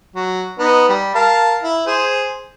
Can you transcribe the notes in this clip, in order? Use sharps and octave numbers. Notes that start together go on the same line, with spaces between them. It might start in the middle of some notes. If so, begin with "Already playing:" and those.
F#3
B3 D#4
G3
A#4 F5 A5
E4
G#4 C5